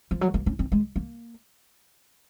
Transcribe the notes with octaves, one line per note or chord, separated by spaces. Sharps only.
F3
F#3
A#3
C#4
C4
G#3
A#3